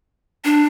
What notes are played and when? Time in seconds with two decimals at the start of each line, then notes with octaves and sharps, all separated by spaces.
0.45 D4